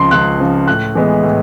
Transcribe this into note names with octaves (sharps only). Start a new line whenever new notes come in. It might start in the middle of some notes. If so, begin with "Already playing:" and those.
Already playing: C#2 C#3 F3 C6
C#2 F#6
C#3 F3
A2 F#6
E3 G#3 B3
A2